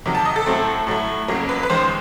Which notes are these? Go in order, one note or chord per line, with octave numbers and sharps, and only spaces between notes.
C3 D#3 F#3
A5
D#5
A4
A2 F#3 A3 C4
A2 F#3 A3
F2 C#3 F#3 A#3
B4
B4
D#2 D#3 G#3 C5